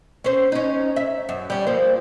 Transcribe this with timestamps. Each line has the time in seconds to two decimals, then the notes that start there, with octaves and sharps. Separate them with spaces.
0.24 C#4 C5
0.52 C#4 D#4
0.96 E5
1.29 F#2
1.50 G3 C#4
1.67 F3 A#3 C4